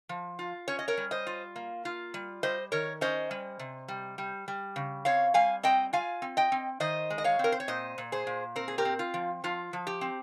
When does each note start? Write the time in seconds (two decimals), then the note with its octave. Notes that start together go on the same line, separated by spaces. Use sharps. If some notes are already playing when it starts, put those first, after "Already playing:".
0.09 F3
0.39 F4
0.68 C#4 C#5
0.79 D#5
0.88 A#4 C#5
0.97 G3
1.11 C5 D#5
1.27 F4
1.56 A#3
1.85 F4
2.14 G3
2.43 G3 C5 D#5
2.72 D#3 A#4 C#5
3.01 C#4 C5 D#5
3.31 G3
3.59 C3
3.88 G3
4.18 G3
4.48 G3
4.76 C#3
5.05 C4 C#5 F5
5.34 G3 F5 G#5
5.63 C4 D#5 G5
5.93 F4 F5 G#5
6.22 C4
6.37 D#5 G5
6.52 C4
6.80 D#3 C5 D#5
7.10 G#3
7.18 D#5
7.24 C#5 F5
7.39 C4 A#4
7.52 C5
7.60 C#5
7.68 A#2 C5 D#5
7.98 A#2
8.12 G#4 C5
8.27 A#2
8.56 C4 A#4
8.68 G#4
8.78 G4 A#4
8.85 C4
8.99 F4
9.14 F3
9.44 F3 F4
9.73 F3
9.87 G4
10.01 C4